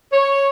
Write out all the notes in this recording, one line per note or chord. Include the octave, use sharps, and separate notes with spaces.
C#5